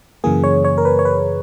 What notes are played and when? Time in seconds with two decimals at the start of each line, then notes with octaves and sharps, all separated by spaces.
0.24 F#2 C#3 E3 A#3 G#4
0.44 C#5
0.64 C#5
0.78 A#4
0.85 B4
0.99 C#5
1.05 B4